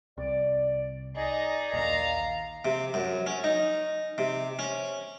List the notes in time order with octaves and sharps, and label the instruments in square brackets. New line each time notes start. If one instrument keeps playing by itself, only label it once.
[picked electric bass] C2 [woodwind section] D5
[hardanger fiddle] D#4 G#4 [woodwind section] D5 D#5
[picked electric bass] A#1 D#2 [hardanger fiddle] F5 A#5
[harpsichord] C3
F#2
C#4
D#4
C3
C#4